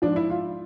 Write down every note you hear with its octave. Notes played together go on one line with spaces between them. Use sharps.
G#2 F3 D4
E4
F4